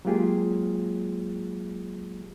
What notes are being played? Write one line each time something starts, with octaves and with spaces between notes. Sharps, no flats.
F#3 G#3 A#3 F4 G4 G#4